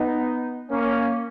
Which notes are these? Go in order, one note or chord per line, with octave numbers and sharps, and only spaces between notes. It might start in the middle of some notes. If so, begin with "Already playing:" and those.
Already playing: B3 D#4
A#3 C#4